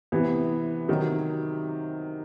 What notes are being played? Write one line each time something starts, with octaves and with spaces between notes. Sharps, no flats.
C3 E3 B3
C3 D#3 F#3